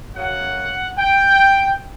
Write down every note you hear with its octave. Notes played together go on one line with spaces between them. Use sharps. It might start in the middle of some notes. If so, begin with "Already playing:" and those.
F#2 C#3 F#3 F#5
G5